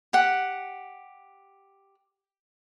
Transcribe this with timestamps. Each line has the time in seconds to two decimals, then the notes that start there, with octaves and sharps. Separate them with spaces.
0.13 G4 F#5